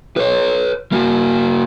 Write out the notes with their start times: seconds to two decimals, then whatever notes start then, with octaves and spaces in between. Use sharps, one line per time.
0.17 B4 C#5
0.92 A#3 F#4